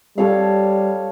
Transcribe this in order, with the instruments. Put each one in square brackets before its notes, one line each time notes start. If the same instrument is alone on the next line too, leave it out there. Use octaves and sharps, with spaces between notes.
[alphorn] G3 [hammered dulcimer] A4 C#5 F5